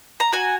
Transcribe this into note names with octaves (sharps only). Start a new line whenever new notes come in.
A#5
F#4 G#5